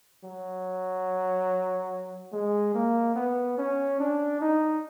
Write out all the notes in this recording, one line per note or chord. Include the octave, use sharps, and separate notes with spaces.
F#3
G#3
A#3
B3
C#4
D4
D#4